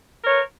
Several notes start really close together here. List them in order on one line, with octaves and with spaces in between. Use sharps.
A#4 C#5 B4